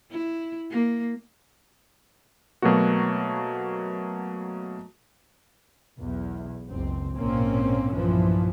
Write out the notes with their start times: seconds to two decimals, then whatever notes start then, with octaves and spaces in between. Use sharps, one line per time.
0.11 E4
0.71 A#3
2.62 B2 F#3 A3 A#3 F#4
5.99 B1 E2
6.70 F#1 C#2 C4
7.15 A#1 G#2 B2 A#3 C4 C#4
7.93 B1 G2 A#2 E3 F3